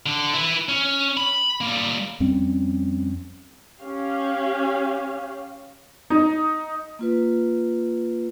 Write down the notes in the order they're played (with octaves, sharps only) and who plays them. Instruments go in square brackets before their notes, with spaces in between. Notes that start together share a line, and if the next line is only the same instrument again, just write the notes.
[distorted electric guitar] D3
E4 B4
C#4
B5
G3 A#3
[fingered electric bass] F2 G3 C4 C#4
[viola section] C#4 G4 F5
[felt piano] D#4
[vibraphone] A#3 F4 B4